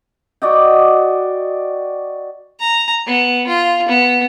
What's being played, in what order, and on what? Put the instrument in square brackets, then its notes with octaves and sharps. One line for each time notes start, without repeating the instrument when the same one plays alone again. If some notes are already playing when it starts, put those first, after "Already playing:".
[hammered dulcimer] F#4 D5 D#5 G5
[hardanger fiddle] A#5
B3
F4
B3